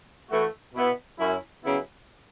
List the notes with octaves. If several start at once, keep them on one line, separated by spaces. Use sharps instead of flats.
E3 A3 F#4
B2 B3 E4
F#2 F#3 C#4 E4
C#3 F#3 B3 E4